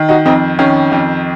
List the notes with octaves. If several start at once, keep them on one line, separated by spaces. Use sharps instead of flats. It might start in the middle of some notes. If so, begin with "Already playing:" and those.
Already playing: D#3
D#4 F#4
F2 C4 D#4
D#3 C#4
F2